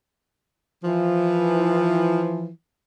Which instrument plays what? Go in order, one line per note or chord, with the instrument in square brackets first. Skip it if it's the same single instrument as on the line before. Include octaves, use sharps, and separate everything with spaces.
[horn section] E3 F3